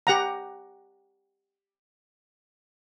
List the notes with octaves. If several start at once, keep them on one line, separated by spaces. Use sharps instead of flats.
G4 F#5 A#5